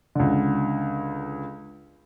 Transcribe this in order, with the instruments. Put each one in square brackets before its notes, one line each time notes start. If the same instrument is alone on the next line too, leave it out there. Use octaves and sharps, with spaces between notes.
[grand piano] C#2 D3